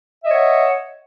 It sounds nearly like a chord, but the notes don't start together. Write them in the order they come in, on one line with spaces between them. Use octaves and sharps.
E5 D#5 C#5 F#5